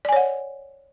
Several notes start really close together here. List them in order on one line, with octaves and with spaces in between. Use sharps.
D5 G#5 C#5 F#5